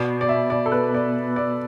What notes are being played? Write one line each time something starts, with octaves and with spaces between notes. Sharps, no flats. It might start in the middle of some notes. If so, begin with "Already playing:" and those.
Already playing: B2 D5
D5
E5
D5
A4
B4
D5
D5